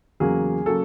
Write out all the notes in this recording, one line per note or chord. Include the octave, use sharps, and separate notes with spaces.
E2 C#3 F#3 A#3 G#4
C#3 F#3 A#3 A4